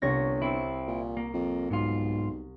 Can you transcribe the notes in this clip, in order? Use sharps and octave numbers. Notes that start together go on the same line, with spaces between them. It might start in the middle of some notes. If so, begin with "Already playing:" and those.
G1 C2 C#5 A#6
C4 E4
A#2
A#3
F2
B1 G#2 F4